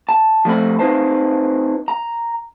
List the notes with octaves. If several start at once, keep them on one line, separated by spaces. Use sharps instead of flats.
A5
F3 A3 C4 B5
C4 D#4 F4 B4 C5 A5
A#5